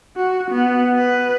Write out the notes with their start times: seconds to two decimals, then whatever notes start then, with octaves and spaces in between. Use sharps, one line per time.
0.16 F#4
0.51 B3
0.97 B4